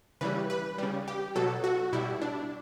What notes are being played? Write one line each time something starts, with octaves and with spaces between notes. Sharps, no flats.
C#3 E3 G3 B4
B4
C#3 G3
G4
B2 F#3 A4
F#4
B2 G3 E4
D4